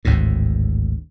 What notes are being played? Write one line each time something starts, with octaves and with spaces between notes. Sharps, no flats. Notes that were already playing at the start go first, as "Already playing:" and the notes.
G#1 D2 A2